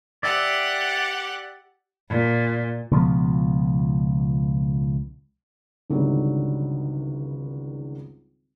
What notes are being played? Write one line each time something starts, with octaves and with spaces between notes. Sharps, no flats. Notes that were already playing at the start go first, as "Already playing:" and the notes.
G4 D5 E5 F#5
A#2
C#2 B2 F3 B3
G#1 C#2 D3 D#3 F#3 G3